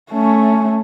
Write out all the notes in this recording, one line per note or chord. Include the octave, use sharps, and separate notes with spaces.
A3 C#4